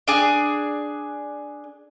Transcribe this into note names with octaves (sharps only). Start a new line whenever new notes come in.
D4 G#4